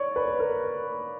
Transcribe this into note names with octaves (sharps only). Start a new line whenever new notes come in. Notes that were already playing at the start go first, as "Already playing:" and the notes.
Already playing: C#5 D5
B4
A#4